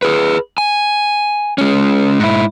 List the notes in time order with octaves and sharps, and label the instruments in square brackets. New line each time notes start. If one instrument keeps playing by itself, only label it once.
[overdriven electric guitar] G#4 B4
G#5
G#3 C#4
G#2 E4